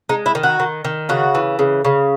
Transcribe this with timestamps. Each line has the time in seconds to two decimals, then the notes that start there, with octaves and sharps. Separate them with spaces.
0.09 G#3 D#4
0.26 E4
0.35 D#3
0.43 F#4
0.60 D#3
0.85 D#3
1.09 C#3 F#4
1.35 E3
1.59 C#3
1.85 C#3